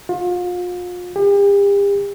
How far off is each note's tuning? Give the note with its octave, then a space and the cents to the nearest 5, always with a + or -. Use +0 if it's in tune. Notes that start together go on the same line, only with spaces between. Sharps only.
F4 +35
G4 +40